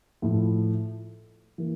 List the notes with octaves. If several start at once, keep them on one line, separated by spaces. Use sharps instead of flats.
A2 F3 A3 E4
E3 A#3